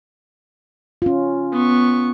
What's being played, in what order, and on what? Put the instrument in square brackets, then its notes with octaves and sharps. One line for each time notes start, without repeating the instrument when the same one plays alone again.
[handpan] C#4 F4
[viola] B3 C#6